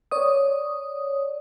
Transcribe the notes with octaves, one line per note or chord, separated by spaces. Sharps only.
C#5 D5 D#6